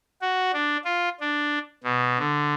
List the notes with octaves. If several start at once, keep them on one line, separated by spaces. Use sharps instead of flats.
F#4
D4
F4
D4
B2
D3